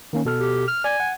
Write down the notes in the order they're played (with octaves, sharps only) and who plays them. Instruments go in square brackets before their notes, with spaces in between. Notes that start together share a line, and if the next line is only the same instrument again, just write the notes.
[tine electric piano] D#3 A#3 C#4
B2 A4 F6
[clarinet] G4
F6
[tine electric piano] D5 [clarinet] G#5
[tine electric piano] F#5